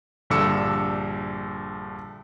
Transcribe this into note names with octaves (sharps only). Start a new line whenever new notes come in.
A#1 G2 D3 D6 E6 C#7